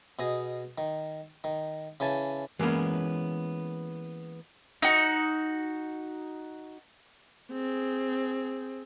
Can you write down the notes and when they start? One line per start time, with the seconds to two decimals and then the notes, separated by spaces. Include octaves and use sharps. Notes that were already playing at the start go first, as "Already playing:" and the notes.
0.19 B2 G#4 D#5
0.78 D#3
1.44 D#3
2.00 C#3 E3 G#5 A5
2.59 E3 G#3 A#3 B3 C#4
4.82 D#4 F#4
7.52 C4 G#4